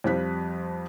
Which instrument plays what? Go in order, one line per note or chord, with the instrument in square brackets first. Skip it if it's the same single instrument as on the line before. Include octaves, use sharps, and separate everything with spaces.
[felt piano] F2 F3 G3 C4 F#6 B6